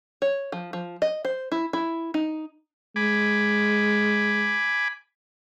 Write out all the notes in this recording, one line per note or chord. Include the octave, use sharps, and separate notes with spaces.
C#5
F3
F3
D#5
C5
E4
E4
D#4
G#3 G#5 B5 D6